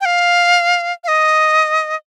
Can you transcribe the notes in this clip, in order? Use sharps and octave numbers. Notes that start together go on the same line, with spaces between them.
G5
F5
F5
D#5